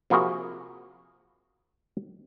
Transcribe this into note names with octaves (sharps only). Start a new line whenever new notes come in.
C3 F3 A#3 E4 F#4 G#4